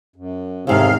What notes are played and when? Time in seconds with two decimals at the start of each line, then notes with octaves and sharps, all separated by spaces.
0.16 F#2
0.67 E2 G#2 C3 D#3 C#4 G#4 A4 F5